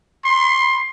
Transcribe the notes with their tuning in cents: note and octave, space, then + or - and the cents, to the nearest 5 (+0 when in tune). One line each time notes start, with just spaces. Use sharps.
C6 +20